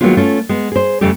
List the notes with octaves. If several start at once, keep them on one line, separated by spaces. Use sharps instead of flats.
D#3 F#3 G#3 A#3 B3 F4
A3 C#4 F4
G#3 B3
G#4 C5
F2 C#3 G3 A3 G4